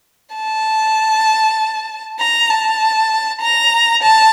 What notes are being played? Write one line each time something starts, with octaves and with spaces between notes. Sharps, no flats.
A5
A#5
A5
A#5
A5